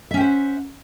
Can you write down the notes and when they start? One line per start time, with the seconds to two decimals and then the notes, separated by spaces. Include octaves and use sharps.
0.11 E5
0.14 C#4
0.17 G5
0.20 C5
0.24 F#5